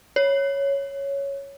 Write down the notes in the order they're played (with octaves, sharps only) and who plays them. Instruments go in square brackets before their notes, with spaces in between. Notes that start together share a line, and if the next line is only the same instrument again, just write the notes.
[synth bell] C#5